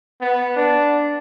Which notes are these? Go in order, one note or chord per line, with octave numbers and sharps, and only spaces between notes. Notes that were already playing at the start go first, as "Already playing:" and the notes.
B3
D4